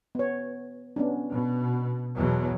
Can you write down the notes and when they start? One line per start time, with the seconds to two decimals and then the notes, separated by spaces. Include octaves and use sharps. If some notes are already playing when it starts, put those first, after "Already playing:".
0.15 B3 C#5
0.96 B3 C#4 D4
1.31 B2
2.16 E2 B2 F#3